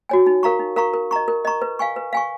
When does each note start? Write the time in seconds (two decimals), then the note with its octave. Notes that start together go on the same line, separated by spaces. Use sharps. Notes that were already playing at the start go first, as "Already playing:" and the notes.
0.09 F#4 C#5 G#5
0.27 D#4
0.43 A#4 F5 A#5 C#6
0.59 D#4
0.76 A#4 F5 A#5 C#6
0.94 A#4
1.11 D#5 A#5 C#6
1.28 A#4
1.45 D#5 A#5 C#6
1.62 B4
1.79 F5 G#5 C#6
1.96 B4
2.13 F5 G#5 C#6